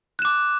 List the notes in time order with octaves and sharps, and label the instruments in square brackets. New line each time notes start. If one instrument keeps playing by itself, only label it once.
[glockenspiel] F#6
E7
D6